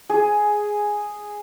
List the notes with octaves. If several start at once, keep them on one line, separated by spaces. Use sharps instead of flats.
G#4